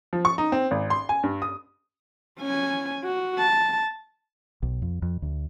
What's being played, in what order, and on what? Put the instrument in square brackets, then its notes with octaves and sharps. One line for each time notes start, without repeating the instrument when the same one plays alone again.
[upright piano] F3
C#6
D#4
C4
G#1
C6
G#5
G2
D#6
[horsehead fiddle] C#4 G#5
F#4
A5
[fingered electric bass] B1
F2
F2
D2